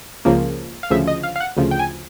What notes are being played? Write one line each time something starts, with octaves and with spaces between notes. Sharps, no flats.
C#2 C#3 F3 A#3
F5
D2 C#3 F3 E5
D#5
F5
F5
F#5
D2 C#3 F3
G5
G#5